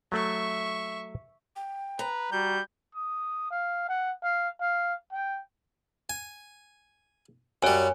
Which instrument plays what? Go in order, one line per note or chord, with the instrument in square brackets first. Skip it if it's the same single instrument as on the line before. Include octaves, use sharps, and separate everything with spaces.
[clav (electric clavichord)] F#3 A3 [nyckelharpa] E5 C#6
[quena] G5
[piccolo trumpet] B4 [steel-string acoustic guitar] A#5
[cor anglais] G3 [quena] F#4 [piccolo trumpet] G6
[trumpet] D#6
F5
F#5
F5
F5
G5
[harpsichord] G#5
[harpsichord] F#2 G3 [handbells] C#5 G#5